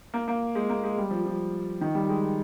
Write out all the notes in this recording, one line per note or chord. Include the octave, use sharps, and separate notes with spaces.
A#3
A#3
G#3
A#3
G#3
G3
F3
F3
D#3
G3
G#3